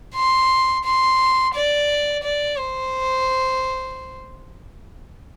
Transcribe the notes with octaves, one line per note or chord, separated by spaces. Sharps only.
C6
C6
D5
D5
C5